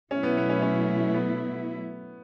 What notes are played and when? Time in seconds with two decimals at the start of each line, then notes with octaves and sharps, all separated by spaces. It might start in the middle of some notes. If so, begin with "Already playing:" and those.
0.11 B2 F#3 A3 C#4 E4
0.23 B3
0.37 B3
0.49 C#4
0.62 C#4
1.14 B3